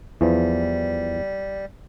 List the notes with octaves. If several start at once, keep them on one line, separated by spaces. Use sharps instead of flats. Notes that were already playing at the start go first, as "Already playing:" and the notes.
E2 E3 F3 G3